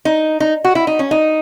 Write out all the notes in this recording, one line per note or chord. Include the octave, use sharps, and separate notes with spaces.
D#4
D#4
F#4
E4
D#4
C#4
D#4